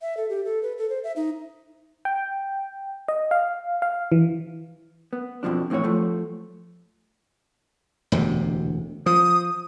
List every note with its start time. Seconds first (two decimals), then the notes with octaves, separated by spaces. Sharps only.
0.02 E5
0.17 A4
0.30 G4
0.45 A4
0.63 B4
0.78 A4
0.90 C5
1.04 E5
1.16 D#4
2.05 G5
3.08 D#5
3.31 F5
3.82 F5
4.12 E3
5.13 B3
5.43 F2 B2 F3 D4
5.70 F2 A2 E3 F4 C#5
5.84 F3 A3
8.12 E1 D2 C3
9.06 F3 D#6